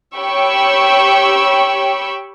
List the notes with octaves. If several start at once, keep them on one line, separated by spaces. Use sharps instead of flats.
G4 C#5 G5 B5 C#6 E6